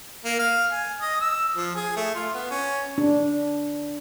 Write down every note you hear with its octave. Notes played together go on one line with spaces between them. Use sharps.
A#3
F5
G#5
D#5
E6
F3
G#4
A3
F4
B3
C#4
D4